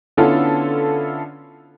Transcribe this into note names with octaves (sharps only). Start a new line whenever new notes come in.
D3 B3 C#4 E4 F4 A4